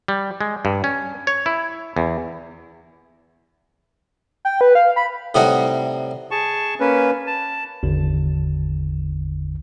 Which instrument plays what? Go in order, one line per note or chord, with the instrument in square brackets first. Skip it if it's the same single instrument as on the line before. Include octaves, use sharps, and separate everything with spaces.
[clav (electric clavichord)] G3
G#3
G2
C#4
C#5
E4
E2
[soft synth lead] G5
B4
F5
B5
[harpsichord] A2 C3 G3 D#4 D#5 F#5
[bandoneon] G#4 A5 C#6
A#3 C#4 B4
A5
[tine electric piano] G#1 E2 D3